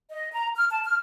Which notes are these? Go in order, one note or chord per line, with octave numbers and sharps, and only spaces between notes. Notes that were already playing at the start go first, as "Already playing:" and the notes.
D#5
A#5
F6
A5
F6